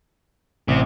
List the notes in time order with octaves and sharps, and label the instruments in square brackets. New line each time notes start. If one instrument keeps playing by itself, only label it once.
[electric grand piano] A1 [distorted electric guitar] C3